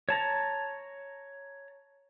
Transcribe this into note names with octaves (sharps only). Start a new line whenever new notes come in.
C#5 A5 A#5